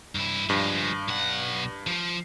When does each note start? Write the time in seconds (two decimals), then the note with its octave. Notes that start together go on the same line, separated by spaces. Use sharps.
0.15 G2 E4
0.50 G2 F3 G#3
1.08 B1 F#5
1.87 F3